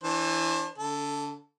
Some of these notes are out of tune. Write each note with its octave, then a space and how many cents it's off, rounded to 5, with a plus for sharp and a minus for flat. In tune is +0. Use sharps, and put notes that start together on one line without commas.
E3 +0 D4 +0 C5 +40
D3 -40 A4 +0